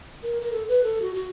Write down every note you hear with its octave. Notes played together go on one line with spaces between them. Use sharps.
A#4
A#4
A4
B4
A4
F#4
F#4